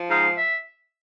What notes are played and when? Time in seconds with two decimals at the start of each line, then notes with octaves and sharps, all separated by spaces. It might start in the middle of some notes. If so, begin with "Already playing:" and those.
Already playing: F3
0.10 G#2 F5
0.37 E5